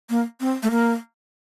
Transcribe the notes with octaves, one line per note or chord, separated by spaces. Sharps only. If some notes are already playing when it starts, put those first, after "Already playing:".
A#3
C4
A3
A#3